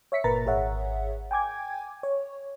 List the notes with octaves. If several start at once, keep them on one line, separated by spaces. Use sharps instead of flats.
C#5 E5 B6 C#7
G1 A#2 A#4 B4 A#5 A6
G#1 G#4 C#5 E5 F#5
G5 G#5 D6 G#6
C#5